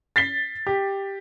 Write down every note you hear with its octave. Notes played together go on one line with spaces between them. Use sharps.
A6 B6 C7 G7
G4